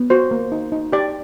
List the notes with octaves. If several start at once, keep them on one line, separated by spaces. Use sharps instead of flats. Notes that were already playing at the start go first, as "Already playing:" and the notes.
Already playing: B3
F#4 C5
A#3
D#4
D#4
G4 D5